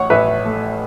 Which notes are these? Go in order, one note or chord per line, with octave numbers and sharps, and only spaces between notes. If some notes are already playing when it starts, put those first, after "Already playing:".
Already playing: A1 A2 C#5 F#5 C#6
A1 B4 E5
A3